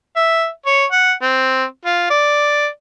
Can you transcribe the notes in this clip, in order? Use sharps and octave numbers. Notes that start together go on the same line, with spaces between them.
E5
C#5
F#5
C4
F4
D5